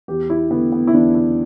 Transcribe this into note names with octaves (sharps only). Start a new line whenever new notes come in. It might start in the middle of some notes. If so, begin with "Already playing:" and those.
E2 G4
E4
D3 A3 B3
B3
E4
E2 D4
E4